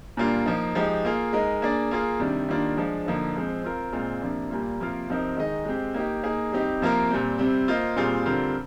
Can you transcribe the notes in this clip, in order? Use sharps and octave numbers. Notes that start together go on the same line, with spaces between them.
A#2 G3 A#3 D4 F4
F3 A#3 D#4
F3 G#3 D#4 G4
A#3 F4 G#4
G#3 D#4 A#4 D#5
A#3 D4 G#4 D5
A#3 F4 G#4
C3 D#3 G3 D4
D#3 G3 A#3 D4 F4
F3 G#3 D4
D3 F3 A#3 D#4
F3 G#3 C4
C4 F4 A#4
A#2 G#3 C4 F4
C3 F3 A#3 D4
A#2 G3 A#3 F4
C3 F3 A#3 F4 A#4
C3 F3 C4 D#4 A#4
D#3 G#3 D#4 G#4 D#5
G#3 C4 G4
A#3 D#4 G4
A#3 D#4 G#4
G3 C4 D#4 G4
C3 F3 A#3 F4 A#4
A#2 G3 C4
C3 G3 C4
A#3 F4 C5 D#5
A#2 G3 C4 F4 G#4
D3 G3 C4 F4 A#4